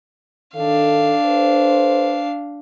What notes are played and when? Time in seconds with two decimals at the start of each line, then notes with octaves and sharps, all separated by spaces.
0.55 D#3 D4 A4 F5
1.26 A4 B4 C5